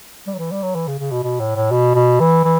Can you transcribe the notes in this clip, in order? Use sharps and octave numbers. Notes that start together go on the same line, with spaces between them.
G3
F#3
E3
G3
F#3
E3
C#3
C#3
B2
B2
A2
A2
B2
B2
E3
E3